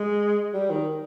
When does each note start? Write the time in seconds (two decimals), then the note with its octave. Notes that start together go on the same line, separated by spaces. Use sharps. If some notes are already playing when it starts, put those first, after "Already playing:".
Already playing: G#3
0.54 G3
0.70 D#3